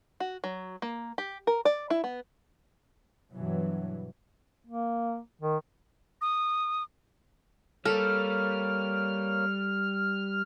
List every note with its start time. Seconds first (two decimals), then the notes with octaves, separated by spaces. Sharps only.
0.20 F#4
0.44 F#3
0.82 A#3
1.18 G4
1.47 A#4
1.65 D5
1.90 E4
2.04 B3
3.33 G2 B2 E3 F#3
4.67 A#3
5.41 D#3
6.21 D#6
7.85 G3 A#3 A4 C#5 F6